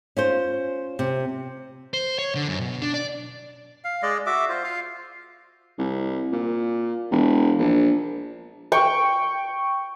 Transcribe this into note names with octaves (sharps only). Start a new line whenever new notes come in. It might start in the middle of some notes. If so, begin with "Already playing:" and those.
C#4 F4 C5
C3
C5
C#5
D3
F#2
B2
D4
D5
F5
G#3 D5 D#5
F#4 E5 D6
F4 C5
F4 F5
C2
A#2
E1
A#1
G5 C#6